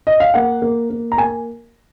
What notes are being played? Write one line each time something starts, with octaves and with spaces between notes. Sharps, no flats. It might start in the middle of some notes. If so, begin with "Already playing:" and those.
D#5
F5
A#3 F#5
A#3
A#3
A#5
A#3 G#5